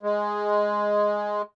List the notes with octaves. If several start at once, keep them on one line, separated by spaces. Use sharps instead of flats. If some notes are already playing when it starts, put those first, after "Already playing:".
G#3